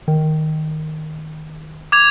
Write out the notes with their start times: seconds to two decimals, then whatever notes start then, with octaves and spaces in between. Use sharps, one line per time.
0.08 D#3
1.92 D6 G#6 F7